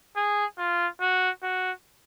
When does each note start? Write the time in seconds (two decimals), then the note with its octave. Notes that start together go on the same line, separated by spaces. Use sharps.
0.16 G#4
0.58 F4
1.01 F#4
1.43 F#4